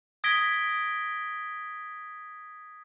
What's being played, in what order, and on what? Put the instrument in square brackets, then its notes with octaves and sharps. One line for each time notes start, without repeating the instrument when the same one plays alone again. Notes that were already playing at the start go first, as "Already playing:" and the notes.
[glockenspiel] D#6 G#6 A#6 B6 D7 G7